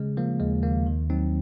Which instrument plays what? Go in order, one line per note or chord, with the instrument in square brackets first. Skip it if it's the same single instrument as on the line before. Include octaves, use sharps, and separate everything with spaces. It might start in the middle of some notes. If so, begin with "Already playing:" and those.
Already playing: [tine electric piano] C#3 G#3
F3 A#3
D#2 G#3
D#2 A#3
D#3
F#3 C4 D#4